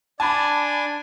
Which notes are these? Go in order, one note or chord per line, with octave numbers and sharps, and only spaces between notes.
D4 G#5 A5 B5